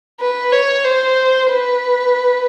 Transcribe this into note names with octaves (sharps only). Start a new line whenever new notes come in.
B4
C#5
C5
B4